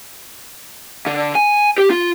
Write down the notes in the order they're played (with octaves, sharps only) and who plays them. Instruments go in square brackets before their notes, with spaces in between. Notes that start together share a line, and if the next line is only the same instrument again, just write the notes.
[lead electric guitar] D3
G#5
G4
F4